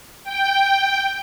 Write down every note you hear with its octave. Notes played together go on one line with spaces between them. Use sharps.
G5